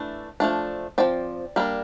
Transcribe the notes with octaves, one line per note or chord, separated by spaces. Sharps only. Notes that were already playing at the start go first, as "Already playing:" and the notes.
Already playing: E3 A3 D4
F3 A3 D4
F3 C4 D5
G3 A#3 D4